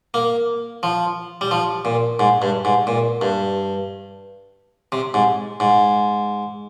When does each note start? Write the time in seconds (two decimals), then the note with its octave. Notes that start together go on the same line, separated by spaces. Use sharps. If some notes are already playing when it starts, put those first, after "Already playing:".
0.14 A#3
0.83 F3
1.41 G3
1.51 F3
1.85 A#2
2.19 G#2
2.42 G2
2.65 G#2
2.87 A#2
3.21 G2
4.92 C3
5.14 G#2
5.60 G#2